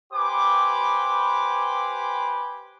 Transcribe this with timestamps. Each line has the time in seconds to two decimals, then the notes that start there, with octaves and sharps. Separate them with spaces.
0.13 G4 B4 C5 G#5 B5 D6